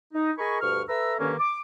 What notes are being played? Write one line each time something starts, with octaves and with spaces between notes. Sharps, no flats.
D#4
G#4 A#4 D#5 G#5 B5 C#6
D2 G2 C#6 F6
A4 B4 E5 A#5 E6
G2 D3 D#3 A#3 C#4
D6